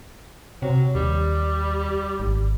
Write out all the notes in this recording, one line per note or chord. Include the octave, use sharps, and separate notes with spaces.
C3 F#3
D#2 G3
G#1